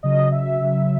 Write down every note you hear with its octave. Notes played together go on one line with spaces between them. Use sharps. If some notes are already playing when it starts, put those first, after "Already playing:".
C#3 F#3 D#5
E5
C#3 F#3